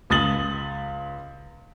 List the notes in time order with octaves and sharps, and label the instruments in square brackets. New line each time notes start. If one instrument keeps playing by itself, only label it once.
[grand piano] C#2 D#6 A6 F#7